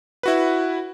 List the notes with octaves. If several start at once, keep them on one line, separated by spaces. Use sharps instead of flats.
E4 F#4 B4